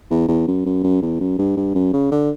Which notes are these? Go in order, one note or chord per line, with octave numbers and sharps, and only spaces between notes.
E2
E2
F#2
F#2
F#2
E2
F#2
G2
G2
F#2
C#3
D3